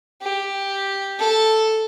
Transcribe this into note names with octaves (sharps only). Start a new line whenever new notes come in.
G4
A4